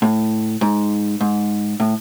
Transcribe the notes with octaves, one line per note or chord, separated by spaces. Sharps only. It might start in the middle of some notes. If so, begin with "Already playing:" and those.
A2
G#2
G#2
A2